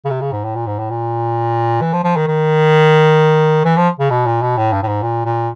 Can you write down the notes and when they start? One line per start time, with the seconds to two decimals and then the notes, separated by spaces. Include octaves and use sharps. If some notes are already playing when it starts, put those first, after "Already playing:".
0.05 C#3
0.10 C3
0.21 C#3
0.32 G#2
0.44 A2
0.55 A#2
0.67 G#2
0.79 A2
0.90 A#2
1.81 E3
1.93 F3
2.04 F3
2.16 D#3
2.27 D#3
3.65 E3
3.77 F3
3.99 C#3
4.10 B2
4.27 A#2
4.42 B2
4.57 A2
4.73 G2
4.83 A2
4.88 G#2
5.03 A#2
5.25 A#2